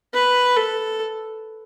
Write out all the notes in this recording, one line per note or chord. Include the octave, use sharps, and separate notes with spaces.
B4
A4